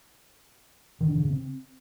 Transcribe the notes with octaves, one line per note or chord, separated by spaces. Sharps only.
D#3
D4
D3
C#3
C4